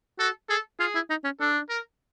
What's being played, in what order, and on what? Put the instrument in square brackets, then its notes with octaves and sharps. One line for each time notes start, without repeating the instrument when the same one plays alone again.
[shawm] F#4 [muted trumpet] A4
[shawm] G#4 [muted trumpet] A4
[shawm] F4 [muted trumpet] G#4
[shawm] E4
D#4
C#4
[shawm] D4 [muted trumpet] A4
[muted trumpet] A#4